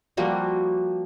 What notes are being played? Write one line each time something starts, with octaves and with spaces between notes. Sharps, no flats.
F3 G3 A#3 F#4